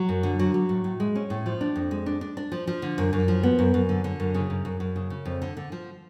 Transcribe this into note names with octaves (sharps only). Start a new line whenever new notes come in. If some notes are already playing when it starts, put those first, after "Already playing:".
Already playing: F#3
F#2
D3
F#3
F#3
A2
A2
G#3
C#4
A2
F3
D4
F2
G#3
D4
D4
D4
F3
F3
D3
F#2
F#2
F3
B3
F#2
F#2
D3
D3
F#2
C#3
F#2
F#2
F#2
C#3
C#3
F2
D3
D3
F3